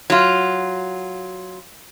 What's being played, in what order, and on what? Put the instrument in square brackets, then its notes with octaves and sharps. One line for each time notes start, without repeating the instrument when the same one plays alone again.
[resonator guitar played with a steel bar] F#3 F4